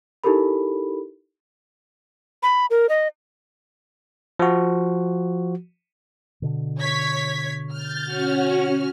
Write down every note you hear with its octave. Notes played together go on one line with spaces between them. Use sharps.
D#4 E4 G4 A4 A#4 B5
B5
A#4
D#5
F3 F#4
B2 D3
C#5 G#6 B6
F6 G6 A6
C#4 F#4